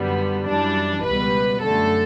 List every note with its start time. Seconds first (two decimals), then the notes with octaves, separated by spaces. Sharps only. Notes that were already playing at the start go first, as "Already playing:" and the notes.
Already playing: F#2 D3 G3 B3
0.47 F#2 E3 G3 D4
1.04 C#2 B2 G3 B4
1.62 F#2 D3 A3 A4